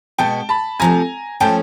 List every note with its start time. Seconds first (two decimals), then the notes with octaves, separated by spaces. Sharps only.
0.18 B2 G#3 B3 G5 A5
0.49 A5 B5
0.80 C3 F3 A3 G#5 A#5
1.40 F3 A3 C#4 G5 A5